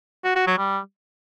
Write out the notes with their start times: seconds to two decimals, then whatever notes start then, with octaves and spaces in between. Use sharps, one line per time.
0.24 F#4
0.35 F#4
0.47 F#3
0.58 G3